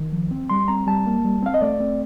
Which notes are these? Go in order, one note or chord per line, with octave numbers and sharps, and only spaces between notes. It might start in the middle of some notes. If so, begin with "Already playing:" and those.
Already playing: D#3
F3
C4
G3 C6
C4 A#5
G3 A5
A#3
G3
C4 F5
D#5
A3 D5
C4